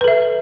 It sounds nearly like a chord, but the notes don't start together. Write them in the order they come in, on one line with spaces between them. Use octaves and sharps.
B4 A4 E5